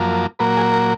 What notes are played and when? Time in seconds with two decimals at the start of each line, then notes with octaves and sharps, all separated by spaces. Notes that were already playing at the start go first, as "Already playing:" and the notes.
Already playing: F#2 F3 A#3
0.39 A#2 F#3 A#3 B4
0.57 G#4
0.73 A#4